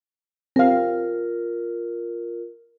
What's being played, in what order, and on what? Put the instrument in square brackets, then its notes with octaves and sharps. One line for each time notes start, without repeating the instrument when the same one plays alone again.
[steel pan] C4 F5 [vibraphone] F4 A#4